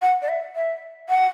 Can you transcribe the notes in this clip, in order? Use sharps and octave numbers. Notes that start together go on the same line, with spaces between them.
F#5
D5
E5
E5
F#5